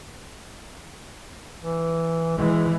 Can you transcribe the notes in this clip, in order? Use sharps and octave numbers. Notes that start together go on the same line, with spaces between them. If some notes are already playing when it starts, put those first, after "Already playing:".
E3
E3 G#3